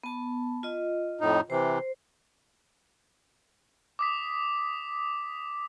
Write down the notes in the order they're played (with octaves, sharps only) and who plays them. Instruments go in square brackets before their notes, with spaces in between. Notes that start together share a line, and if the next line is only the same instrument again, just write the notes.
[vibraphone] B3 A5
F4 D#5
[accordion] F2 A2 D#4
[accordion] C3 E3 [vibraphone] C5
[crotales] D6 D#6 B6